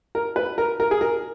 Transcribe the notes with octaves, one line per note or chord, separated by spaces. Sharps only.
A#4
B4
A#4
A#4
G#4
A#4